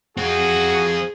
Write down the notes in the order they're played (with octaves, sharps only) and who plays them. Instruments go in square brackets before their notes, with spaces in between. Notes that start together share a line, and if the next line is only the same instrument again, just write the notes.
[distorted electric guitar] F3 C4 [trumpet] F#4 [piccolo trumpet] G#4